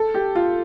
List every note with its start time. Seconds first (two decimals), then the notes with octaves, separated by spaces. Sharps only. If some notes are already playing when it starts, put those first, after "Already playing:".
Already playing: A4
0.14 G4
0.35 F4